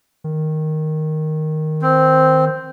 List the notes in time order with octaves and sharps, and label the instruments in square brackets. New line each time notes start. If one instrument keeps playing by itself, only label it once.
[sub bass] D#3
[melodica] C4